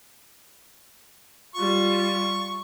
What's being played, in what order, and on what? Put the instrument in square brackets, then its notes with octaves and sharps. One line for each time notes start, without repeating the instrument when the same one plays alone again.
[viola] G3 F4 [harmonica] C#6